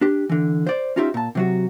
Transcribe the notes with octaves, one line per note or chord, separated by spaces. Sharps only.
D4 G4
D3 E3
C5 D5
C#4 D#4 F4 G4 C5 E5
A#2 A5
C3 F#3 F#4